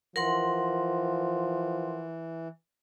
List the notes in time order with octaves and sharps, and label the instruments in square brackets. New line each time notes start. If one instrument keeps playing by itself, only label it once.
[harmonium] E3 [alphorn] F3 [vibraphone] A#4 F#5 C6